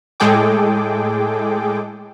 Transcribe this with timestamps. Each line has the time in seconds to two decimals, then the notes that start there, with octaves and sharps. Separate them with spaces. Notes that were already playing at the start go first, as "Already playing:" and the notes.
0.20 A2 G#3 G#4 A4 G5 D6